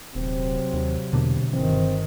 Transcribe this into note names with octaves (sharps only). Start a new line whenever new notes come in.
D#1 C3 F#3 C4
D#2
E2 B2 D3 A#3
G1 D#3 E3 C4